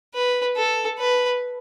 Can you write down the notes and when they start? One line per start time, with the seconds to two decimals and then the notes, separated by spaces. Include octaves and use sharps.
0.14 B4
0.56 A4
0.99 B4